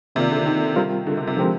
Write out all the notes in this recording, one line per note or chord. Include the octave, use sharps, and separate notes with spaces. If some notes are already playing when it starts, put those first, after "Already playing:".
C3 D#3 A#3 F4 A#4 D5
D3
D#3
G3 C4 F4 A#4
D3
C3
C3
D3 F3 G#3 C4 G4 A#4